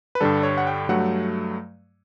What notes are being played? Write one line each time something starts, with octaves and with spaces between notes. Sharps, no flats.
B4
G2 D3 G3 A4
C#5
F#5
G5
G2 F#3 A3 F#5